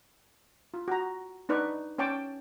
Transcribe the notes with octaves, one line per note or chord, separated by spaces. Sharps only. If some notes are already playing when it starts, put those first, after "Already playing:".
F4
F#4 A#5
D4 D#4 B4 D5 C#6
C#4 C#5 G5 A5 D6